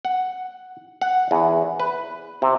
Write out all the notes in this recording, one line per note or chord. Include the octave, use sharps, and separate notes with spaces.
F#5
F#5
E2
B4
C3